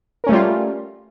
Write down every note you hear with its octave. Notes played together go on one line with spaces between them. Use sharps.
G3 A3 C#4 F4 A#4